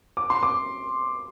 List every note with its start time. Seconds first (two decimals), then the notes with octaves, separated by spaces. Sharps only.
0.17 D6
0.30 C6
0.43 D6